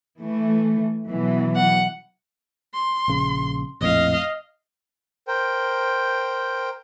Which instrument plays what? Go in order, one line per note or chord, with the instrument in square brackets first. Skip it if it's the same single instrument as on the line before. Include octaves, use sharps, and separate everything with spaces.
[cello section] E3 A3
B2 E3 F#3
[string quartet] F#5
[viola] C6
[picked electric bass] A#1 C#3
[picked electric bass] A#1 F2 A2 [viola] D#5 F5
[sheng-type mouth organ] A#4 C5 G5